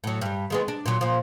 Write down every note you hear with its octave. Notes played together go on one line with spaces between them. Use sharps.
A2 F#3
G2 G3
D#3 G#3 B3
D4
A#2 F#3
A#2 F3